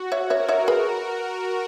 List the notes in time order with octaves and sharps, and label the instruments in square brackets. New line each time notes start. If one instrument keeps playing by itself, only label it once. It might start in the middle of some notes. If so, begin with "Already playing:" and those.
Already playing: [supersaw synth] F#4
[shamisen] C#5 E5
[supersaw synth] A#4 [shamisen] C#5 E5
[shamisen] C#5 E5
G#4 B4